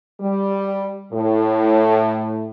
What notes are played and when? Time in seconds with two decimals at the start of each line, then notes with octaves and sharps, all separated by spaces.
0.20 G3
1.13 A2